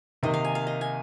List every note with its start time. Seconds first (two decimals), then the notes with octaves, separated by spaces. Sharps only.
0.23 C3 D#3 A#3 D#5
0.34 F5
0.45 G#5
0.55 F5
0.67 D#5
0.81 G#5